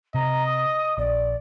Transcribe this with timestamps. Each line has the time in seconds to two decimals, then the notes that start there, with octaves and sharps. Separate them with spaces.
0.15 C3 D#5 A#5
0.46 D#6
0.98 A#1 D5